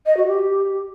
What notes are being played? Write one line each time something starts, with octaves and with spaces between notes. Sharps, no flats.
D#5
F#4
G4